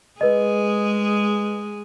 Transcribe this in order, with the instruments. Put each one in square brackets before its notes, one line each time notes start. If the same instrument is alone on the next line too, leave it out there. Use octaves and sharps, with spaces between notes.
[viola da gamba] G#3 G#4 [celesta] B4 D#5